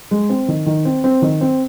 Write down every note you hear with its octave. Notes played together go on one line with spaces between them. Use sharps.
G#3
C4
D#3
D#3
C4
C4
D#3
C4